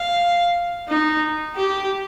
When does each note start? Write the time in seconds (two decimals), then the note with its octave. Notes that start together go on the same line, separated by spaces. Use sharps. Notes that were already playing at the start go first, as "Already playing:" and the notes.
Already playing: F5
0.88 D#4
1.56 G4